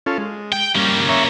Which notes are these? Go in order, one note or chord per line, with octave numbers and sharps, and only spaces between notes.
C#4 F4 A4
G#3
G5
G3 A#3 C#4
C#5 E5 A#5